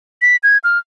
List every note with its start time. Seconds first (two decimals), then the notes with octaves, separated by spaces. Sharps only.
0.22 B6
0.43 G#6
0.64 F6